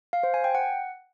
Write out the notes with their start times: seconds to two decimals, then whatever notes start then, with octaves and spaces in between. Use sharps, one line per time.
0.13 F5
0.23 C5
0.34 G#5
0.44 G5
0.55 F#5